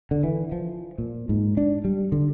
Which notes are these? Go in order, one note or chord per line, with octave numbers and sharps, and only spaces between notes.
D3
E3
F3
A#2
G#2
D4
G3
D3